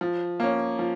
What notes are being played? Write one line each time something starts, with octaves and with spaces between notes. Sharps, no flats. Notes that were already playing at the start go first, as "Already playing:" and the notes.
F3
A#3 C#4
F3